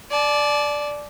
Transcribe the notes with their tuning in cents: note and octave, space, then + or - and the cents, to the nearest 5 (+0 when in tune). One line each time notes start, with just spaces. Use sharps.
D5 +0 A5 -40